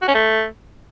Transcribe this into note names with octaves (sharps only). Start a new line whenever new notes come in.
F#4
C#4
A3